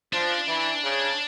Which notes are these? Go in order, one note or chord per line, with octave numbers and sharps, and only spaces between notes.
F3 D4
E3
C#3